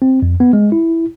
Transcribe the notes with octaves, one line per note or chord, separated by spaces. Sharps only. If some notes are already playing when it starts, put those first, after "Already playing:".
C4
F2
B3
G#3
E4